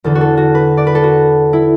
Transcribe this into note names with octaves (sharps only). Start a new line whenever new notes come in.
E2 D3 A4
F#4
A4
F#4
B4
D5
B4
A4
F#4
E4